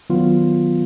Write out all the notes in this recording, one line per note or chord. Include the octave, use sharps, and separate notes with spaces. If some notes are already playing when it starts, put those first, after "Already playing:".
D#3 F#3 B3 F4